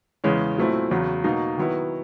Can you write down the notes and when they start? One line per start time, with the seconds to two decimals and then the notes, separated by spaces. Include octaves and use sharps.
0.24 E2 C#3 E3 G#3 C#4
0.58 A#2 F#3 A3 C4 E4
0.91 E2 C#3 F#3
1.24 B2 F#3 A#3 D#4
1.58 D#3 F#3 B3 E4